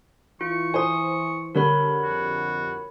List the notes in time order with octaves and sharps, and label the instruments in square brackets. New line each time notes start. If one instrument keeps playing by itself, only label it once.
[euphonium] E3 [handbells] F4 [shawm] C#6
[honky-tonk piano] C5 [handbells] G#5 C6 D#6
[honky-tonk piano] D3 G3 [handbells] A#4 C#5 B5
[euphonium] F2 [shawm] F#4